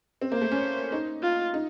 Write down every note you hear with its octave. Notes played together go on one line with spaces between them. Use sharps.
C4
A#3 C5
A3
C#4
D#4
F4
D#4